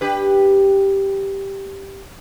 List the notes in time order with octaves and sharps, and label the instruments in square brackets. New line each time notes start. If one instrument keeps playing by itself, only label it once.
[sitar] D4 G4 B4